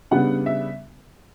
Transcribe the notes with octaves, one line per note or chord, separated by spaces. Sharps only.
C#3 G3 B3 D4 F#5
E5